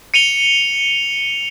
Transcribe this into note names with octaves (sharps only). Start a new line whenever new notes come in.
C#7 D#7 F7 G7